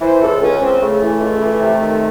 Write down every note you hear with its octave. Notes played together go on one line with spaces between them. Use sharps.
E3 C5
C#2 A4
C#2 C#4
C#2 C4
C#3 A3
E3
C#2
E3
C3
D#3